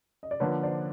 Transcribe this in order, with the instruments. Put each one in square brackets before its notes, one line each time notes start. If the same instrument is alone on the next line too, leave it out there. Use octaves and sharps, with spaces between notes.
[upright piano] D#5
D5
[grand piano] D3 F3 A#3 D4 [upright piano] B4 C#5
[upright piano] C5 D5